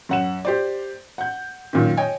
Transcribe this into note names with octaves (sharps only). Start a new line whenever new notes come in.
F#2 F#5 E7
G4 C5 D5
F#5 G6
F#2 A#2 D#3
C#5 D#5 G5 G#5